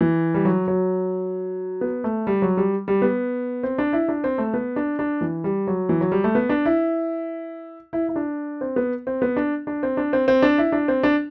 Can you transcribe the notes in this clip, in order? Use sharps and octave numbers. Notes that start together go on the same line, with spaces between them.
E3
G3
F#3
F#3
B3
A3
G3
F#3
G3
G3
B3
C4
D4
E4
D4
C4
A3
B3
D4
D4
E3
G3
F#3
E3
F#3
G3
A3
B3
D4
E4
E4
E4
D4
C4
B3
C4
B3
D4
D4
C4
D4
C4
C4
D4
E4
D4
C4
D4